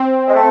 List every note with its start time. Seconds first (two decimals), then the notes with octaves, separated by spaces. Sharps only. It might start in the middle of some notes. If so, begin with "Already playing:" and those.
Already playing: C4
0.28 G#3
0.34 A3